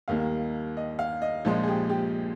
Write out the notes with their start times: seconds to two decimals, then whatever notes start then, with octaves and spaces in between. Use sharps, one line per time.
0.08 D#2 D#3 G3 A#3 F5
0.77 D#5
0.99 F5
1.22 D#5
1.45 A#1 A#2 F3 G#3 F4
1.63 G#4
1.68 G4
1.89 G4